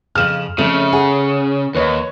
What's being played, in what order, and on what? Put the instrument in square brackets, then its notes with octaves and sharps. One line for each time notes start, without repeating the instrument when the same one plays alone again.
[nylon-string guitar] F2 C#3 [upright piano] F6 E7 F#7
[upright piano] F2 [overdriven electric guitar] C#3 [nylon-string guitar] A3
[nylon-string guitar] G#4 [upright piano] F#5 G#5
[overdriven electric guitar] D#2 [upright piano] B4 C#5 D#5